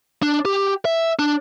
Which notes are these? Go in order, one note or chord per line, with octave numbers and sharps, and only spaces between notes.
D4
G4
E5
D4